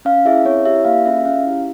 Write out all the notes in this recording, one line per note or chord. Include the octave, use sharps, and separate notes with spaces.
C#4 F5
E4 G#4 E5
C4 C#5
E4 G4 E5
A#3 F5
C#4 F4 G#4 E5
C#4 F5
E4 G4